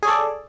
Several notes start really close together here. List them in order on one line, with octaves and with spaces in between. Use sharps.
G#4 C#5 A4 D5